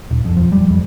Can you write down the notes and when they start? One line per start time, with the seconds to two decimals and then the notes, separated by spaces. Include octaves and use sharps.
0.11 D#1
0.25 F2
0.37 F3
0.52 G3
0.70 F2